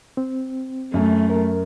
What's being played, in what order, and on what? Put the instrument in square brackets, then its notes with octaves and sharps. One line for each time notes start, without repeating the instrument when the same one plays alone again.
[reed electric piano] C4
[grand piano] F#2 [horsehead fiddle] A3
[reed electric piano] A#4